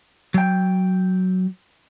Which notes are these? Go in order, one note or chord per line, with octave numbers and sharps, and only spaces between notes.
F#3 G5